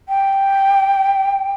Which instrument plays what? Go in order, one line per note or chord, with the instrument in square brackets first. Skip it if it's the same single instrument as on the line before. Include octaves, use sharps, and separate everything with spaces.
[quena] G5